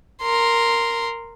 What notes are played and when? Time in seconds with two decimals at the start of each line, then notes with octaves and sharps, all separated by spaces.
0.22 A#4 C6